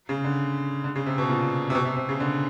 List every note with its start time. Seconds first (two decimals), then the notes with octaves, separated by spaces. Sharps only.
0.09 C#3
0.24 D3
0.84 D3
0.96 C#3
1.06 C3
1.18 B2
1.30 A#2
1.70 C3
1.75 B2
1.85 C3
1.96 C3
2.09 C#3
2.20 D3